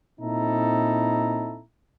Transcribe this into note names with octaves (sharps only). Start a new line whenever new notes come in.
A#2 C4 D#4 E4 A4 A#5